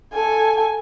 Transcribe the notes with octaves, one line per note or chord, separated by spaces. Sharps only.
A4 G#5